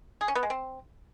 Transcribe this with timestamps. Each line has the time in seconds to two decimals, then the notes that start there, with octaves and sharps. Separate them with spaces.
0.21 G#4
0.28 C#4
0.35 B3
0.43 G#3
0.50 C4